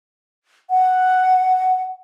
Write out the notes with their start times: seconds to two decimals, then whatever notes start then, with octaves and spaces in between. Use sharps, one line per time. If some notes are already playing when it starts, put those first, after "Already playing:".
0.70 F#5